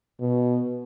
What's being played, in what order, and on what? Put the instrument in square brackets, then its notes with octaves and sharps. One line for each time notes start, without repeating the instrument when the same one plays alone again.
[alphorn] B2